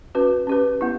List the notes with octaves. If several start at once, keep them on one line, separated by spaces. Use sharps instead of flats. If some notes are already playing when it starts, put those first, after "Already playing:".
C#4 F#4 B4
C#4 G4 B4
B3 E4